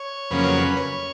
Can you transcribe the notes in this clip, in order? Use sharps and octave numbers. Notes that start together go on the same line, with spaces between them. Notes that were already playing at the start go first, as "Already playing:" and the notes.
Already playing: C#5
F2 C#3 F#3 A#3 C#4 B4
C#5
B4
C#5